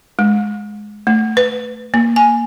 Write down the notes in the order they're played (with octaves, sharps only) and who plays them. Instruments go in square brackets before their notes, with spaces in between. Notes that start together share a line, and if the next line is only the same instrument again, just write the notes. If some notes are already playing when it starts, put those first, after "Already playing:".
[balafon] G#3
A3
B4
A#3
G#5